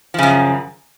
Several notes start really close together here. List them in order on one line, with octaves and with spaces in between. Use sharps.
F3 C#3 F#2